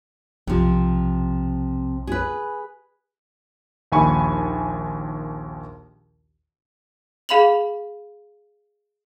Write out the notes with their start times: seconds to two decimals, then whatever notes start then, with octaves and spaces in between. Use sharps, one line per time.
0.47 B1 C3 F3
2.07 G#4 B4
3.92 A#1 D#2 E5 G#5 B5 C#6
7.29 G#4 F5 B5 F7 F#7